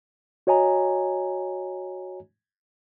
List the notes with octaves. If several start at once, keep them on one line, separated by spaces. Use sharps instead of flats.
F#4 C#5 D#5 G#5 A#5